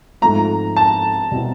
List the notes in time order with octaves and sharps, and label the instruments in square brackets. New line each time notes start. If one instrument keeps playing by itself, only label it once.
[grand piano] G#2 F3 A3 C4 [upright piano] A#5
[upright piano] A5
[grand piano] B2 G3 C4 E4